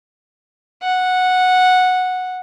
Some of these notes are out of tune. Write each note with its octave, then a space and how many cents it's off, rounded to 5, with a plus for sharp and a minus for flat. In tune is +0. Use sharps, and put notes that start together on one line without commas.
F#5 -10